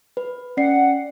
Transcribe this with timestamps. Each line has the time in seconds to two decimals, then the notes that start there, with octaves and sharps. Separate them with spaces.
0.17 B4
0.57 C#4 D5 F#5 C7